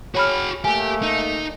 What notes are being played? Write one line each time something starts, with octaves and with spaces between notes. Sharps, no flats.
F#4 G#4 C#5 B5 F6
A3 A#3 G4 G#5
D#4